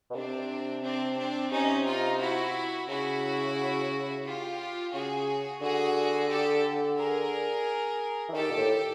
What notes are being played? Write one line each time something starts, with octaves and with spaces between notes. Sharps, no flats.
B2
C3 C4 D4
C4 D4
C4 D4
C3 C#4 D#4
D#4 F4
E4 F#4
C#3 E4 F#4
F4 G4
C#3 F#4 G#4
D3 F#4 G#4
G4 A4
G#4 A#4
E3
D#3 G4 A4
A#2
A2